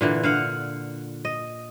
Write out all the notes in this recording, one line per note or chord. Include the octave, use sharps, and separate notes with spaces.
A#2 D3 E3
D3 F5 F#5
D#5